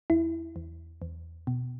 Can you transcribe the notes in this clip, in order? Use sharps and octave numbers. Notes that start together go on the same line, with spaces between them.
E2 E4
E2
E2
B2